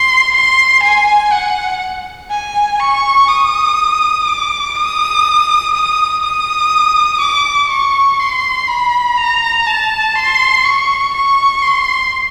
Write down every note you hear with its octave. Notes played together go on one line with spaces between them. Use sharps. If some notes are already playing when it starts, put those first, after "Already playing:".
Already playing: C6
C6
G#5
F#5
G#5
C#6
D#6
D6
D#6
D#6
D#6
D6
C#6
C6
B5
A#5
A5
C6
C#6
C#6
C6